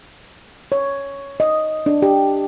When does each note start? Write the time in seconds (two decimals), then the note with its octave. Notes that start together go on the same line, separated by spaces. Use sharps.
0.72 C#5
1.40 D#5
1.86 D4
2.02 G4